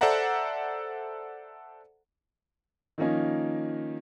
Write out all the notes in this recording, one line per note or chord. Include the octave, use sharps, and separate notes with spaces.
A4 C5 D5 E5 F#5 A#5
D#3 F3 A#3 C#4 D#4